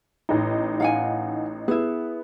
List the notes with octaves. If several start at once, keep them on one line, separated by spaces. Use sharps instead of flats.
A1 D#4
F5 F#5 G#5
B3 E4 G#4